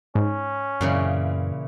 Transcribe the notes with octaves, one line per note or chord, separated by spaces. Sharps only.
G#2 C#4
F#2 A#2 C#3 E3